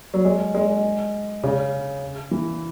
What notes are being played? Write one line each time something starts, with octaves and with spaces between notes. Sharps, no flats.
F#3
G#3
G#3
C#3
E3